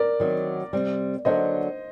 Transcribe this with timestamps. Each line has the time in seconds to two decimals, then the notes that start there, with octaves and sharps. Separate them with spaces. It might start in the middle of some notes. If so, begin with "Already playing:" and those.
Already playing: A#4 D5
0.20 D#3 F#3 C4 F#4
0.73 C3 G3 C4
1.25 D3 F#3 A#3 D4 C5 D#5